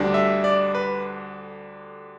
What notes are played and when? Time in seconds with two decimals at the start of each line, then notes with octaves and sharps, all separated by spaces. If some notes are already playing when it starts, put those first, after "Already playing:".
Already playing: D2 D3 G3 D4
0.14 E5
0.44 D5
0.75 B4